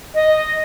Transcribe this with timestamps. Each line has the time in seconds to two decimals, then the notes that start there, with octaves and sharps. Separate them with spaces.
0.14 D#5